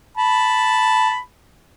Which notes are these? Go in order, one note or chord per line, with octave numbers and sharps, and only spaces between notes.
A5 B5